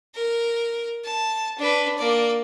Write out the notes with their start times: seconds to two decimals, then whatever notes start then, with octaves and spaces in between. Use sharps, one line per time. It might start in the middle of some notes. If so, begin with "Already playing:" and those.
0.15 A#4
1.04 A5
1.58 D4 B4
1.98 A#3 D5